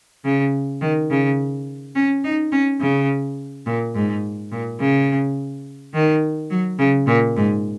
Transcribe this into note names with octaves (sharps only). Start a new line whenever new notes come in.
C#3
D#3
C#3
C#4
D#4
C#4
C#3
A#2
G#2
A#2
C#3
D#3
F#3
C#3
A#2
G#2